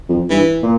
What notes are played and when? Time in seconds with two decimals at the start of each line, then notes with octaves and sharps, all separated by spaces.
0.09 F2
0.30 G2 E3
0.63 A#2